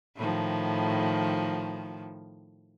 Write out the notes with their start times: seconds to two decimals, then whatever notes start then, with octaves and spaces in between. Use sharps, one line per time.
0.17 A2 D#3 F3